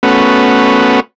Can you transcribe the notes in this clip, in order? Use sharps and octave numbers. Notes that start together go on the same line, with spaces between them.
A3 B3 C#4 F#4 B4